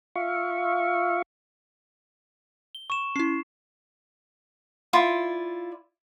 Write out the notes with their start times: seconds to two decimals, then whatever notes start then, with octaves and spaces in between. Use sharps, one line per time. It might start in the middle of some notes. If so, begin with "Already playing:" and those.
0.15 F4 E5 F5 C#6
2.75 G7
2.90 C#6 E7
3.16 C#4 E4 C7
4.93 E4 F4 D5